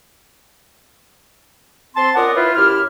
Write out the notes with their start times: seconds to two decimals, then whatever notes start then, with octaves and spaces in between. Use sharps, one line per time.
1.96 C4 A5 C6
2.15 C#4 F4 A#4 D5 D#5 F#5
2.36 E4 F4 B4
2.55 F#2 E4 G4 F6